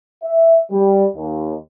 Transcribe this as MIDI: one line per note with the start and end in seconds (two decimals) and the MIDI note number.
0.23 0.58 76
0.72 1.06 55
1.16 1.55 39